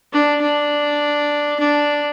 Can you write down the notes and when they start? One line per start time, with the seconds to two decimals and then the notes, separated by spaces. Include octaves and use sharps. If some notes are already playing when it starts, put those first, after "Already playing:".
0.13 D4
0.42 D4
1.59 D4